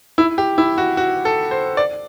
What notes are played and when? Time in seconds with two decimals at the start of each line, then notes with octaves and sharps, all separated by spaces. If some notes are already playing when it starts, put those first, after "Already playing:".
0.18 E4
0.38 G4
0.58 E4
0.78 F#4
0.97 F#4
1.25 A4
1.51 C5
1.77 D5